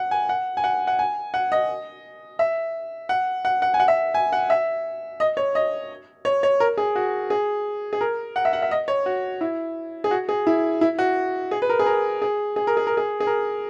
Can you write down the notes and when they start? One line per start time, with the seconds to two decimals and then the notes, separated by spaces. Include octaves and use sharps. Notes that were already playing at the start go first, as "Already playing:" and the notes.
Already playing: F#5
0.11 G#5
0.29 F#5
0.57 G#5
0.64 F#5
0.87 F#5
0.99 G#5
1.34 F#5
1.52 D#5
2.39 E5
3.09 F#5
3.45 F#5
3.62 F#5
3.74 G#5
3.80 F#5
3.88 E5
4.14 G#5
4.33 F#5
4.50 E5
5.20 D#5
5.37 C#5
5.55 D#5
6.25 C#5
6.43 C#5
6.60 A#4
6.78 G#4
6.96 F#4
7.30 G#4
7.93 G#4
8.01 A#4
8.36 F#5
8.45 E5
8.53 F#5
8.62 E5
8.71 D#5
8.88 C#5
9.06 F#4
9.41 E4
10.04 G#4
10.11 F#4
10.29 G#4
10.47 E4
10.81 E4
10.99 F#4
11.51 G#4
11.62 B4
11.69 A#4
11.79 G#4
11.86 A#4
12.22 G#4
12.56 G#4
12.67 A#4
12.77 G#4
12.87 A#4
12.97 G#4
13.20 G#4
13.27 A#4